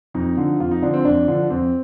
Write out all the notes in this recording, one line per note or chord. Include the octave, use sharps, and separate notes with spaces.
F2 D#4
D3 F3
F2 F4
D#4
D3 F3 D4
C4
F2 D4
D3 F3
F2 C4